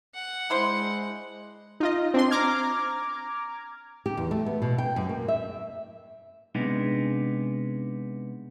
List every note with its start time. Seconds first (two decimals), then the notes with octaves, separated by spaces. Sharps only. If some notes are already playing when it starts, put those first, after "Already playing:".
0.15 F#5
0.50 G#3 D4 E4 C5
1.80 D#4 F4 D#5
2.14 C4 D4 C6
2.31 A#5 D6 F6 G#6
4.06 G4
4.17 E2
4.31 A3
4.46 B3
4.62 B2
4.78 G5
4.96 F#2
5.09 A#3
5.28 E5
6.55 C3 G#3 B3 D4 D#4